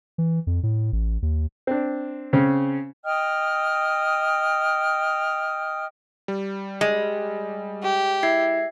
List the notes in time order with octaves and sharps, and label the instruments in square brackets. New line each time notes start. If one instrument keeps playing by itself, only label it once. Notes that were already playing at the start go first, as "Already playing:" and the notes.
[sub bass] E3
F2
A2
A1
D#2
[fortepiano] C4 D4
C#3 C4 C#4
[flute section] D#5 G5 D#6 F6
[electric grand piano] G3
[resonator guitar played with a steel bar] G#3
[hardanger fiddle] G4
[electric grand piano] E4 [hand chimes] E5 G#6 C7